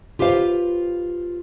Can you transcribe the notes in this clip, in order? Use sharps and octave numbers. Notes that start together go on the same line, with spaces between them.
F4 G4 B4 C5 F5